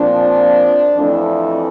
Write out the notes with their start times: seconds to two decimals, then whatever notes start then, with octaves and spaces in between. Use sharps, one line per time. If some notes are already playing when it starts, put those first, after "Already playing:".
Already playing: A#2 F3 C4 D4
0.97 F2 E3 A3 D4